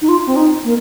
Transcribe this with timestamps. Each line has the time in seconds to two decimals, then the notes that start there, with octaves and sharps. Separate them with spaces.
0.02 D#4
0.09 F4
0.27 C4
0.36 D#4
0.64 A#3